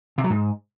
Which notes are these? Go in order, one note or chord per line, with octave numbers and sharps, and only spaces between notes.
C3
F#3
G#2